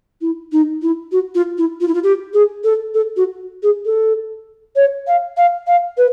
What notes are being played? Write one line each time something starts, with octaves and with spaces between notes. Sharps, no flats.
E4
D#4
E4
F#4
F4
E4
F4
E4
F4
G4
G#4
A4
A4
F#4
G#4
A4
C#5
F5
F5
F5
B4